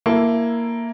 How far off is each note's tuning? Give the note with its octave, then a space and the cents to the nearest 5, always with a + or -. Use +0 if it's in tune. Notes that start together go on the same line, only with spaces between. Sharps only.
A#3 +0 E4 +10 A4 +0